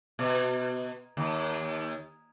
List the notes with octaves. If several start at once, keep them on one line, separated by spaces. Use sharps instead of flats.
B2
D#2